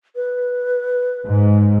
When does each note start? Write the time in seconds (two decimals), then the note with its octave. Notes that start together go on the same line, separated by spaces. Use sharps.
0.16 B4
1.25 G#2